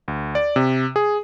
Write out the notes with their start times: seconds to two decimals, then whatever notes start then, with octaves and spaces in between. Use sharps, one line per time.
0.08 D2
0.35 D5
0.56 C3
0.96 G#4